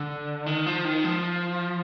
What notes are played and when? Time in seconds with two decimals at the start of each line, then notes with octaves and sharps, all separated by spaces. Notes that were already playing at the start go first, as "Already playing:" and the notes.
Already playing: D3
0.46 D#3
0.66 F3
0.85 D#3
1.04 F3